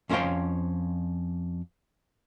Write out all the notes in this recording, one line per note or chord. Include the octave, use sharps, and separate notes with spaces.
F2 C#4 C5 C#5 F5 G5